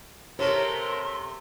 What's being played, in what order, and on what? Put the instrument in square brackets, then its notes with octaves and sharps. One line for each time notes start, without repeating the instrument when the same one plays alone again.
[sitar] C3 A3 [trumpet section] A#4 [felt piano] C#5 [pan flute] C6